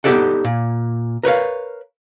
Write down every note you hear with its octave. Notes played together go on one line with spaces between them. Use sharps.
B3 D#4 G4 A4 D5 F#5
A#2
A#4 B4 C#5 F5